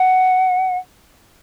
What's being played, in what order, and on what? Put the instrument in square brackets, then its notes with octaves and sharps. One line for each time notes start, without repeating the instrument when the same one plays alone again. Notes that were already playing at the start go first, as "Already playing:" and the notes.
Already playing: [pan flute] F#5